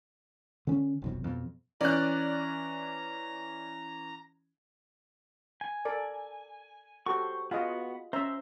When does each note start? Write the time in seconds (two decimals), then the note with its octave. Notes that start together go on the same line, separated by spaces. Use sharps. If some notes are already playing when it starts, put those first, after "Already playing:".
0.67 D3 C#4
1.02 F1 B1 F2
1.24 F2 B2
1.81 E3 C#4 D5 A#5 F#6
5.61 G#5
5.85 A4 A#4 D5
7.06 F#4 G4 A4 C5 C#6
7.51 B3 F4 F#4 G#4 D#5
8.13 C#4 C5 E5 A#5 E6